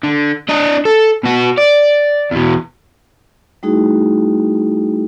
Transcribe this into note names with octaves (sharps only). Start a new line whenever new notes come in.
D3
D4 D#5
A4
B2 F#4
D5
E2 B2
G3 A3 D#4 E4 F#4 G#4